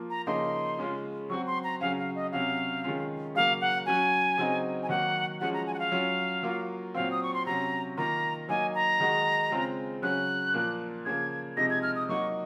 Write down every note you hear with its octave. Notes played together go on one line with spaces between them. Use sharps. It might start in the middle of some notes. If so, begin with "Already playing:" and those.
Already playing: F3 A#3 F4
A#5
C#3 F3 A#3 D#4 C6
C#3 G#3 C#4 F4
F#3 C4 F#4 C#6
C6
A#5
C#3 F#3 C#4 F5
F5
D#5
C3 F#3 C#4 F#4 F5
D#3 G#3 C#4 F4
C#3 F#3 A#3 F5
F#5
F#3 C#4 F#4 G#5
C#3 F#3 C4 D#4
G#5
D#3 F#3 A#3 F#5
F3 G#3 C#4 F#4 F#5
A#5
G#5
F#5
F5
F#3 C#4 F4
F#3 A#3 F4
A#2 F#3 C4 F5
D#6
C#6
C6
C3 F#3 C#4 A#5
D#3 A#3 F4 A#5
F#3 A#3 D#4 G#5
A#5
D#3 G#3 D#4 F#4
C#3 G#3 C4 F4
C#3 F#3 C#4 F#6
A#2 F3 A#3
C#3 F3 A#3 G#6
C3 F3 G#3 D#4 A#6
G#6
F6
D#6
F#3 A#3 D#4 F#4 C#6